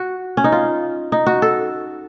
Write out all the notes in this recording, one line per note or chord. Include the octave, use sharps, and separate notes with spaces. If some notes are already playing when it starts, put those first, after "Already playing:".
Already playing: F#4
C#4
D#4
F4
D#4
F#4
A4